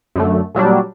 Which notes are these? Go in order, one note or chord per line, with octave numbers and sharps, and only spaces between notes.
F#2 D3 A3
A#2 F#3 G3 D4